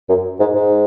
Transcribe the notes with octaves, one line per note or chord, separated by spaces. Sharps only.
F#2
G#2
G#2